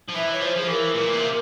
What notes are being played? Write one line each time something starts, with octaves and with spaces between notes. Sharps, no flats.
F3
E3 E5
C#5
F3 C5
F3 G#4
E3 A#4
A#2
C3